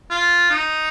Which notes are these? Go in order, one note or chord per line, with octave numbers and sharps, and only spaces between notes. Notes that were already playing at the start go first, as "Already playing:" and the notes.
F4
D#4